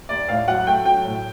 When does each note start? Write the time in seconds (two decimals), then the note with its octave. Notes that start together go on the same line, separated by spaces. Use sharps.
0.09 D#2 D5
0.29 A2 F5
0.48 F#3 F#5
0.67 A3 G5
0.85 F#3 G5
1.05 A2